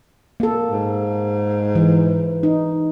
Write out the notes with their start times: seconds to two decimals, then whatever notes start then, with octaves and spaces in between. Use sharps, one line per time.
0.40 A#3 A4
0.71 G#2
1.75 E3
2.43 D#4